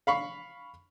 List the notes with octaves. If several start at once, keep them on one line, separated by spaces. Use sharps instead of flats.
F5 B5 C#6